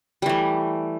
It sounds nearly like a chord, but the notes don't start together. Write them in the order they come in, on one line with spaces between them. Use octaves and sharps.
G3 E3 A3